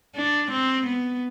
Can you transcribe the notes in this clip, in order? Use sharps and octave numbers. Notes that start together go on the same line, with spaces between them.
D4
C4
B3